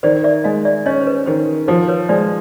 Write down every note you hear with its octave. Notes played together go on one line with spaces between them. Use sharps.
D#3 C5 D5
D5 E5
G#3 D#5 F5
D5 E5
C#4 C#5 D#5
C5
B4 C#5
D#3 C5
F3 C5
B4 C#5
G#3 C5 D5